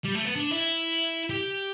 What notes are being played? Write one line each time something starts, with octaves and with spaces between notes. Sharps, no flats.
G3
A3
B3
D4
E4
G4